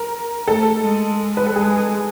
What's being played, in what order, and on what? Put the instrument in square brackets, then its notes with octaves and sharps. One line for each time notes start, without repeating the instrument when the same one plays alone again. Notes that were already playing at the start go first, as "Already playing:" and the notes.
Already playing: [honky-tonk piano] A#4
[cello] A3 [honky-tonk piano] A4
[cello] G#3
[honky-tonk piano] B4
A4
[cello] G#3 [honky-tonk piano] G#4